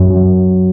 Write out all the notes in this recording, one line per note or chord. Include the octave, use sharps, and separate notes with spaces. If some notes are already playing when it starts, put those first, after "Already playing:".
Already playing: F#2 F#3